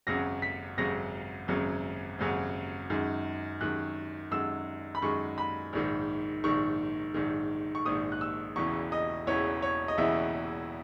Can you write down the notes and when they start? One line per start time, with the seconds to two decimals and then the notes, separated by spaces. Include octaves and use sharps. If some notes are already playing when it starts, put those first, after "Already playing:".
0.07 G#1 F#2 C#3 F#3 A#6
0.42 B6
0.78 G#1 F#2 C#3 F#3 A#6
1.48 G#1 F#2 C#3 F#3
2.19 G#1 F#2 C#3 F#3
2.90 F#2 D#3 G#3
3.61 F#2 D#3 G#3 F#6
4.31 F#2 D#3 G#3 E6
4.95 B5
5.02 F#2 D#3 G#3 C#6
5.38 B5
5.73 A#1 G#2 D#3
6.44 A#1 G#2 D#3 C#6
7.14 A#1 G#2 D#3
7.75 C#6
7.86 A#1 G#2 D#3 D#6
8.12 F#6
8.21 E6
8.56 E1 E2 C#3 E3 C#6
8.92 D#5
9.27 E1 E2 C#3 E3 C#5
9.62 C#5
9.88 D#5
9.98 E1 E2 C#3 E3 E5